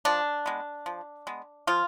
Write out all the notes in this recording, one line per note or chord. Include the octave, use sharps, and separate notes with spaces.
F3 D4
G#3 B3
F3
G#3 B3
F3 F4